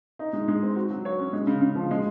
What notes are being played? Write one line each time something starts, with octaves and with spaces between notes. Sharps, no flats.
D#4
G#3
G#3
C4
F#4
F#3
C#5
C#4
G#3
C#3
C#3
F3
G#3